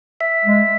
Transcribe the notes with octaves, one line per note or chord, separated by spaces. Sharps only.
E5
G#3